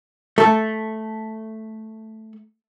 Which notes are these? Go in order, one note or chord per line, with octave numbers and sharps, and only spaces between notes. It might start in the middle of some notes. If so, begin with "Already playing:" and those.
A3 A4